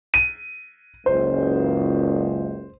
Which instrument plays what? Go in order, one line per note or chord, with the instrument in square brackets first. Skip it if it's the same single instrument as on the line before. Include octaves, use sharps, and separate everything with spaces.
[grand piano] D#7
[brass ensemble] F#1 C#2 [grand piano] C5